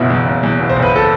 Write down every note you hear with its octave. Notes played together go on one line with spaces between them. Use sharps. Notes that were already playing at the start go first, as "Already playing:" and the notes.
Already playing: F#1 B2 E4
E2
F#1
E2
B2
C5
F#1
B4
A4